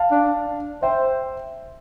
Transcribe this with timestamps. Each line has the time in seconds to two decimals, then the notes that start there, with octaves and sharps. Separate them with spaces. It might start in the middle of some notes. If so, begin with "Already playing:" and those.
Already playing: F5 A5
0.11 D4
0.82 C5 E5 G5